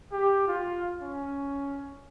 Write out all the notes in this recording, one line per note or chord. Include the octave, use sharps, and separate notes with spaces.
G4
F4
C#4